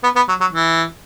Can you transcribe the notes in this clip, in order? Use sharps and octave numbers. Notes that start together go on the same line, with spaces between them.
B3
B3
F#3
F#3
E3